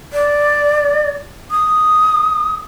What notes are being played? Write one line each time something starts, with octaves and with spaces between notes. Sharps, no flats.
D5
D#6